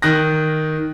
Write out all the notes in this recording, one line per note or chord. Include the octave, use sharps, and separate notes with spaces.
D#3 F#6 A#6